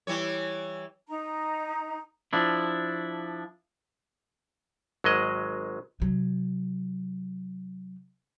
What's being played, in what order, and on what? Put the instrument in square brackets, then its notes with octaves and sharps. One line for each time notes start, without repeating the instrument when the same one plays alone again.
[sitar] E3 G3 C#5
[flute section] D#4 A#5
[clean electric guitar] F3 D4 E4
[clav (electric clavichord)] G#1 F#3 G#3 D#5
[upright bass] C3 F#3